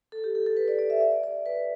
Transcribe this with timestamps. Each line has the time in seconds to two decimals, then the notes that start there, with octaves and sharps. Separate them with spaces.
0.12 A4
0.24 G4
0.35 A4
0.46 A4
0.57 B4
0.68 D5
0.79 D5
0.90 E5
1.01 D5
1.23 D5
1.46 B4